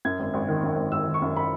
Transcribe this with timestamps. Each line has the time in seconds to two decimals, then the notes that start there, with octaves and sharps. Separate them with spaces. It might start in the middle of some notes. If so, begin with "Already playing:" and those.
0.05 F#2 G#6
0.19 G#1
0.34 G#1
0.48 D#3
0.63 F#2
0.77 G#1
0.92 G#1 E6
1.06 D#3
1.14 C#6
1.22 F#2
1.36 B5